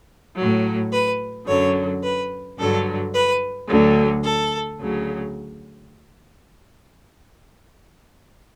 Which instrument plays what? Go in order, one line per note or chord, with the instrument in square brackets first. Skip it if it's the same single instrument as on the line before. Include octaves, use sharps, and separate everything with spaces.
[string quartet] A2 F#3
B4
F#2 D3 F#3 C#5
B4
G2 D3 F#3 A4
B4
D2 D3 F#3
A4
D2 C#3 F#3